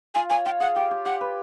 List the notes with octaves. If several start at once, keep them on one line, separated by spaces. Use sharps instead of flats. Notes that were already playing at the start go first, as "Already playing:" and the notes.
F4 G#5
C#5 G#5
F4 G5
G#4 F#5
G4 G5
G4
G4 F#5
B4